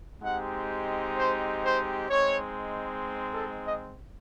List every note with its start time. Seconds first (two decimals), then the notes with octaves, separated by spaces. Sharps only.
0.22 G#3 C4 D#4 G4 F#5
1.16 C5
1.63 C5
2.09 G#3 C4 D#4 C#5
3.33 A4
3.65 D#5